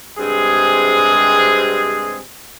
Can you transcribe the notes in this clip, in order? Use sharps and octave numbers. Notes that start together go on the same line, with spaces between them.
G2 C3 G#3 C4 G#4